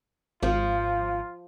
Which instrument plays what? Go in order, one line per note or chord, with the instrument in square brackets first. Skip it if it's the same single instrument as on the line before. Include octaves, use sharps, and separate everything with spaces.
[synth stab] G#1 [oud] F3 [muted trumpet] F4 [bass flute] F5